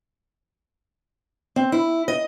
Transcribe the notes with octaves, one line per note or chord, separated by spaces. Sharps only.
C4
E4
D#5